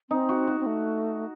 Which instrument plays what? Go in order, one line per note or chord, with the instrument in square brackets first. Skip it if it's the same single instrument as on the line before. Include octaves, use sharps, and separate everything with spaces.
[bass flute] C4 [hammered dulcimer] D#4
[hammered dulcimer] F#4
F#4
[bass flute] C4
A3